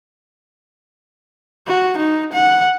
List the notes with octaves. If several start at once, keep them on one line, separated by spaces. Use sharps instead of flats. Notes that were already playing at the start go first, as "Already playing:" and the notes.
F#4
D#4
F#5